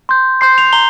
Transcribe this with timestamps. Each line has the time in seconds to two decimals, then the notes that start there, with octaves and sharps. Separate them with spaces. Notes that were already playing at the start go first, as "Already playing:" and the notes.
0.09 C6 G6
0.41 C6 G6 C7
0.58 F7
0.73 A#5 G7